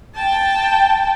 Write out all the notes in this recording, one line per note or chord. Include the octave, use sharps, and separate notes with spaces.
G5 A5